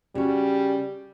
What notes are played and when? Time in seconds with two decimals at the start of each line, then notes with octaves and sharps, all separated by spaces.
0.15 C#3 G3 F#4